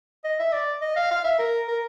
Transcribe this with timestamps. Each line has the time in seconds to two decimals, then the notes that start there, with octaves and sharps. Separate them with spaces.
0.24 D#5
0.39 E5
0.53 D5
0.81 D#5
0.96 F5
1.11 F5
1.24 E5
1.39 A#4
1.68 A#4